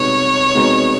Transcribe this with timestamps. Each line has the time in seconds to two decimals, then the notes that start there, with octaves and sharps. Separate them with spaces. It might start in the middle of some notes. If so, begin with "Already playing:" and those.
Already playing: C2 B2 G#3 B3 D#4 C#5
0.55 C2 B2 G#3 B3 D#4